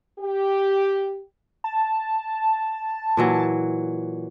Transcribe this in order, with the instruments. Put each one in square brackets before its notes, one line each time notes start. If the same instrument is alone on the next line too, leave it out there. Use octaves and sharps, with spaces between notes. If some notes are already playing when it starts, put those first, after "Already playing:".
[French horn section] G4
[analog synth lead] A5
[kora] A#2 E3 F#3